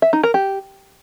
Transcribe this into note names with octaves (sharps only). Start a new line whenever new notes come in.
E5
D#4
A#4
G4